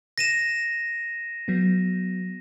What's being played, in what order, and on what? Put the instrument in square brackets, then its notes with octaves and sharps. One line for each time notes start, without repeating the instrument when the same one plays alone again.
[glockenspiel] A#6 D#7 E7
[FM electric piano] F#3 B3